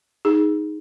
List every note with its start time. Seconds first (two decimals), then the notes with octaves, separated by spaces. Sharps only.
0.25 D#4 G#4